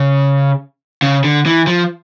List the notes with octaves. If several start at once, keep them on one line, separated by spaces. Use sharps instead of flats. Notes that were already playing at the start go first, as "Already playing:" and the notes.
Already playing: C#3
C#3
D3
E3
F3